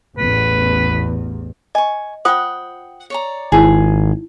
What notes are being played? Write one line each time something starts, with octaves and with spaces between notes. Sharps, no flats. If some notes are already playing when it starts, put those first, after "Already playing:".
A1 E2 B4
D#5 G#5 C#6
F4 C5 F#5 G5 D#6
C#5 D5 A#5
G#1 D#4 E4 G#4